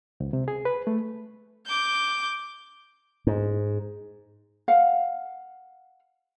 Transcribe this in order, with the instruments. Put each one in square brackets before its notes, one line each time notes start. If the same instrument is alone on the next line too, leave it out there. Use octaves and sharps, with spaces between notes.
[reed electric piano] C#2
C3
G#4
B4
A3
[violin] D6 G6
[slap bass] G#2
[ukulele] F5 F#5